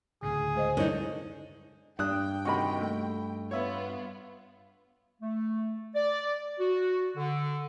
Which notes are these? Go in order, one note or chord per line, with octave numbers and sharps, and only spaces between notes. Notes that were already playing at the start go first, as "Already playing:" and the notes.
D2 A2 C#3 G#4
G#3 C5 D#5
D3 D#4 E4 A#4 C#5
G2 D4 G5 D#6 F#6
C3 D#3 F#4 D#5 B5
A3
B3 F4 C#5 E5
A3
D5
F#4
D3